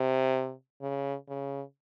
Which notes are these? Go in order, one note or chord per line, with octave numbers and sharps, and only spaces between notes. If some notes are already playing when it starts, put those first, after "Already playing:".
Already playing: C3
C#3
C#3